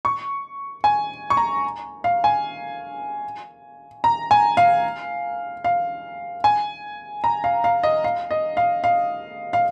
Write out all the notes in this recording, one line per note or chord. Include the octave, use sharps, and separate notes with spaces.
C#6
G#5
C#6
A#5
F5
G#5
A#5
G#5
F5
F5
G#5
A#5
F5
F5
D#5
F5
D#5
F5
F5
F5